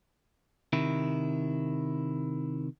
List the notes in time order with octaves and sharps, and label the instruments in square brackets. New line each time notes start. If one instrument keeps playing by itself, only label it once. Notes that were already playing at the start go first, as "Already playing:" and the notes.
[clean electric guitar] C3 D#3 E4